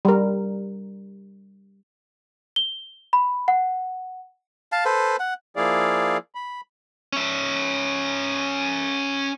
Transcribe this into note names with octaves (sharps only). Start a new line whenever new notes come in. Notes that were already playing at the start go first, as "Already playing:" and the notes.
G3 A#4
G7
B5
F#5
F5 A5
A4 B4 C5
F#5
F3 A#3 E4 G#4 D5 F5
B5
C#4 E5